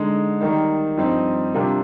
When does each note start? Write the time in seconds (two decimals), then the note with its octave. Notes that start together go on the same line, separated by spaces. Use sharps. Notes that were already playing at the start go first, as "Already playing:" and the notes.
Already playing: D3 G#3 D#4
0.41 D#3 G3 A#3 D#4
0.98 G2 F3 C4 D#4
1.54 C3 G3 D4 F4 A#4